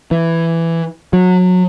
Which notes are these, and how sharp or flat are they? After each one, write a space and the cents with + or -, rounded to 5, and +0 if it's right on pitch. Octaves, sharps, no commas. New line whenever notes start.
E3 +10
F#3 -25